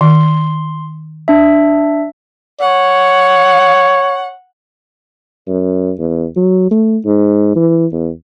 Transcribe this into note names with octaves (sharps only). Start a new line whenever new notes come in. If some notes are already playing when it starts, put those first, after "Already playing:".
D#3 C6
D4 E5
C#5 F#5
F#2
E2
F#3
A3
G#2
E3
E2